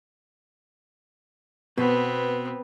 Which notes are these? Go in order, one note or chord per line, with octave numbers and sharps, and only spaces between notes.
B2 B3 C4 B4